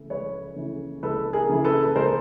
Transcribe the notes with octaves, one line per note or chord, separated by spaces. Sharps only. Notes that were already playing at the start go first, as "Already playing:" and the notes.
Already playing: C#3 E3 A3
C#2 B4 C#5
C#3 E3 A3
C#2 A4 B4
G#4 A#4
C#3 E3 A3
A4 B4
B4
C#2 A#4 C5